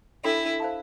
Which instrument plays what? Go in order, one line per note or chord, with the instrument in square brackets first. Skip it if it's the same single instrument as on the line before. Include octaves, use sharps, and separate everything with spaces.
[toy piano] D4 A4 E5 G5 B5 [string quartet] E4
[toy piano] C5 F5 A5